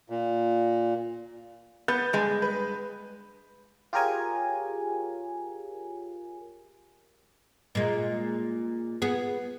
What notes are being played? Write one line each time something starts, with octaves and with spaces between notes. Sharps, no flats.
A#2
B3 B4 G6 A6
G2 G#3
B4
F4 G4 G#4 A#4 C#5 G#5
A#2 G#3
B3 G#4